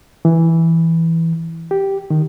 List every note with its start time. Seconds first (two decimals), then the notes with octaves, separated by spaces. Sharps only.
0.25 E3
1.71 G4
2.10 D#3